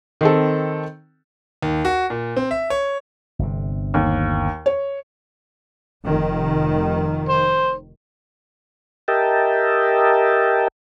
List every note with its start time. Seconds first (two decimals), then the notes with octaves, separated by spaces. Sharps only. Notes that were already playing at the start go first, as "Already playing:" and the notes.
0.21 D#3 C4 A4
1.63 D#2
1.85 F#4
2.10 A#2
2.37 C4
2.51 E5
2.70 C#5
3.39 G1 C3
3.94 D#2
4.66 C#5
6.04 F1 D#3
7.29 C5
9.08 G4 A#4 D#5 E5 G5 A5